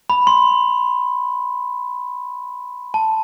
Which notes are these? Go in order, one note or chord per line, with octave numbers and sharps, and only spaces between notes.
B5
C6
A5